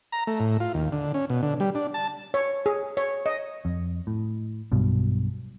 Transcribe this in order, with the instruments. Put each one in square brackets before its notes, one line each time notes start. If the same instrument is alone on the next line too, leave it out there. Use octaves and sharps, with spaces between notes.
[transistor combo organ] A#5
A3
A2
F4
D#2
D3
C#4
B2
D3
G3
D4
A5
[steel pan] C#5
G#4
C#5
D#5
[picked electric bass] F2
A2
B1 G2 B2